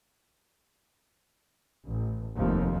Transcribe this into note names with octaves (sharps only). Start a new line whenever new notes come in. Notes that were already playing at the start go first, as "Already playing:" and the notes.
A1
F1 D#2 F3